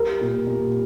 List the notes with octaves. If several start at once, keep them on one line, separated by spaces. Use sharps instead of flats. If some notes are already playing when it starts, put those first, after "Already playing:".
Already playing: G3 A#4
A#2
A#2